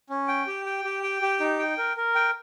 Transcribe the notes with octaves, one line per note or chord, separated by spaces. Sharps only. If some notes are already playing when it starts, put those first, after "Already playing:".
C#4
G5
G4
G5
G4
G5
G4
D#4
G5
A#4
A#4
G5